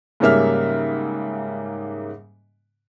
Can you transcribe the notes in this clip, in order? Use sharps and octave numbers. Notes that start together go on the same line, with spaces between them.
G#2 C#3 G3 A#3 E5 F6